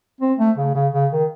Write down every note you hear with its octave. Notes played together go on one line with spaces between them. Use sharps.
C4
A3
C#3
C#3
C#3
D#3